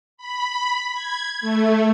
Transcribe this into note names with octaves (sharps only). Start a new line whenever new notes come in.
B5
G#6
A3